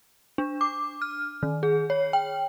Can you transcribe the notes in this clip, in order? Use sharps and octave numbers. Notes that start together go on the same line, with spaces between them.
D4
D6
F6
D#3
G#4
C#5
G5